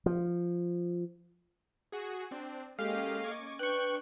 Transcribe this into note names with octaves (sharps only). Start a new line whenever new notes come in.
F3
F#4 G#4
C4 D4
G#3 A#3 C#4 G4 A4 D#5 F5
C#6 D6 G#6
D4 B4 G5 C#6 F#6 G6